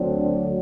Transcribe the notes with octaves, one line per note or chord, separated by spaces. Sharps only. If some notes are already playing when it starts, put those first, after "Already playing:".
Already playing: D2 D3 F#3 C4 D4